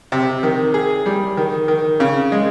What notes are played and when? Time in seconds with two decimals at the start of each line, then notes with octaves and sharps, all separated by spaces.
0.12 C3
0.43 D#3
0.74 G#4
1.06 G3
1.37 D#3
1.68 D#3
2.00 C#3
2.32 G#3